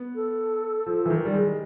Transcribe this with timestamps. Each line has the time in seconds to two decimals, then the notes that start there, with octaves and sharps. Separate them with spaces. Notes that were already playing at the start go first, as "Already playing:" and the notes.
Already playing: B3
0.15 A4
0.86 F3
1.06 E3
1.10 D#3
1.25 G3
1.33 G#3